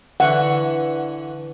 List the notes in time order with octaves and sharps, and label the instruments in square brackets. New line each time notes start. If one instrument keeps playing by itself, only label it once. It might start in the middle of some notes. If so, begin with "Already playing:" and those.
[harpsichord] D3 E3 C#6 [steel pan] F#5